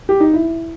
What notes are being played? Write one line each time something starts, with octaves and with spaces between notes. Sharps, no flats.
G4
D#4
E4